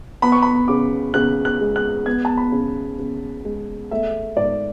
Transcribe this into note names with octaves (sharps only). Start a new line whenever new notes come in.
B3 B5
C#6
B5
C#3 D6
C#3 F#6
F#6
G#3
F#6
B3 G#6
A5
B5
C#3
C#3
G#3
A3 E5
G#2 D5